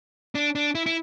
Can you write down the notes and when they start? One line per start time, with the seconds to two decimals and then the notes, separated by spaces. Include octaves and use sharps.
0.35 D4
0.55 D4
0.75 E4
0.86 E4